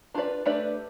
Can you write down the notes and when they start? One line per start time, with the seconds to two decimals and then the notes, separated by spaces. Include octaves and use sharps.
0.14 D4 F4 B4 D5
0.46 A3 D4 G4 B4 D5